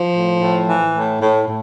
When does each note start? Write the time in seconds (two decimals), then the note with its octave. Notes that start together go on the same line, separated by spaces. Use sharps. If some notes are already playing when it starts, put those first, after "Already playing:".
Already playing: F3
0.12 A2
0.38 A2
0.66 E3
0.93 A2
1.20 A2
1.46 A2